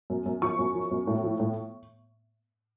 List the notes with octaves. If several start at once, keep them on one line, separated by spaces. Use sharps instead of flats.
F#2
F#2
F3 C#6
F#2
F3
F#2
A2
F3
A2